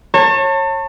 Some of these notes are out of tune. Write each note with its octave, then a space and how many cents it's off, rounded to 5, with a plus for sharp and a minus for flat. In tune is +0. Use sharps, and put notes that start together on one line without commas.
C#5 -25 A5 +35